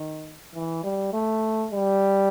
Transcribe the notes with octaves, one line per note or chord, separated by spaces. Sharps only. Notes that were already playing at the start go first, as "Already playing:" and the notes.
Already playing: D#3
E3
G3
A3
G3